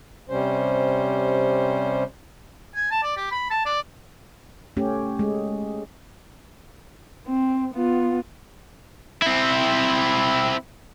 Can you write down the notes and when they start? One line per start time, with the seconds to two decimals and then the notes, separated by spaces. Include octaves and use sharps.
0.30 C3 G3 C#4 C5
2.75 G#5
2.91 A5
3.03 D5
3.17 G4
3.32 B5
3.50 A5
3.66 D5
4.77 A3 C#4 G4
5.19 G#3
7.27 C4
7.74 B3 F4
9.22 C4 E4